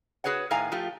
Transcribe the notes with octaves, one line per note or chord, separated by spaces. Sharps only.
F#4 G#4 B4 C#5 F#5
A2 D#3 F5 G#5 A#5
F3 A3 F4 G4